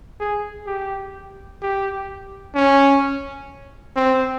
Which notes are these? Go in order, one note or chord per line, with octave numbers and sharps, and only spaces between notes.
G#4
G4
G4
C#4
C4